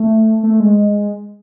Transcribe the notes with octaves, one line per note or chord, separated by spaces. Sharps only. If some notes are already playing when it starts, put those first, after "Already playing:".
Already playing: A3
A3
G#3